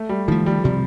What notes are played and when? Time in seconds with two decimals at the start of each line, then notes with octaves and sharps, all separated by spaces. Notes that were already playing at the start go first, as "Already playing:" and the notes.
Already playing: A3
0.09 G3
0.28 D#3 F3 A3
0.46 G3
0.64 C3 G3